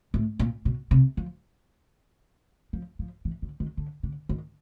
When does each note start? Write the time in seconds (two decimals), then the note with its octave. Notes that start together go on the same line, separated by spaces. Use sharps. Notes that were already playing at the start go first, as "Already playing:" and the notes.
0.14 A2
0.39 A#2
0.65 B2
0.91 C3
1.17 F3
2.73 F3
2.99 F3
3.25 E3
3.42 D3
3.60 D#3
3.77 D3
4.03 D3
4.29 D#3